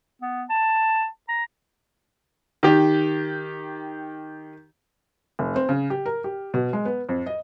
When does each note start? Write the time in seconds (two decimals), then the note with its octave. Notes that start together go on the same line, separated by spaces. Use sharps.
0.22 B3
0.49 A5
1.29 A#5
2.63 D#3 G4
5.39 F1
5.56 C4
5.69 C#3
5.90 G4
6.06 A#4
6.24 G4
6.54 B2
6.73 G#3
6.85 B3
7.09 F2
7.26 D#5